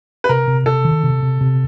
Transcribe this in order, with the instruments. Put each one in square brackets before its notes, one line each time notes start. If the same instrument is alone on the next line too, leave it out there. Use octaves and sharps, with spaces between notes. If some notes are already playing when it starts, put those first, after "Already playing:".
[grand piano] B4
[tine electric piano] C3 [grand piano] A#4
[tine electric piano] C3
[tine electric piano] C3 [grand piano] A4
[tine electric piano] D#3
C3
C3
C3